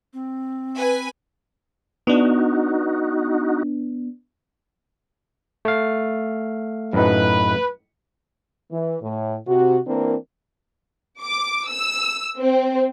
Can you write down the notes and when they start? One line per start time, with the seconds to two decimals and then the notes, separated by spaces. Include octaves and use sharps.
0.14 C4
0.77 B4 G#5
2.07 B3 D4 D#4 F#4
5.65 A3 F5
6.93 F#2 A2 D#4 B4
8.71 E3
9.02 A2
9.47 C3 F#4
9.87 E3 A#3 C4 D4 A#4
11.22 D6
11.69 E6
12.42 C4